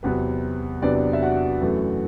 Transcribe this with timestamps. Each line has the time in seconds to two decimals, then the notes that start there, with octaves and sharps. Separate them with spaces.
0.03 E2 C3 F#3 B3 B4
0.82 E2 C3 F#3 B3 D4 D5
1.13 E5
1.22 F#4 F#5
1.61 F#2 E3 A3